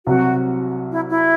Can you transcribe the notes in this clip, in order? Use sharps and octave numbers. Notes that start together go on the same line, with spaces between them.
C2 C3 F#3 F#4
E4
E4